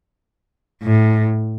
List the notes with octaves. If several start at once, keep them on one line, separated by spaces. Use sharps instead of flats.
A2